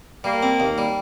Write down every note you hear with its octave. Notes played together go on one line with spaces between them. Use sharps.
G3 A#3
C4
D#2
G3